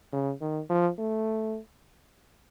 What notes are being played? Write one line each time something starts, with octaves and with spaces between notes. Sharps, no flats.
C#3
D#3
F3
A3